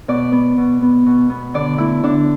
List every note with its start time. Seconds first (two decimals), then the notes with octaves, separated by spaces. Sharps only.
0.08 B2 D5
0.32 B3
0.58 B2
0.82 B3
1.06 B2
1.30 B3
1.54 D3 D5
1.78 A3 E4
2.04 D3 D4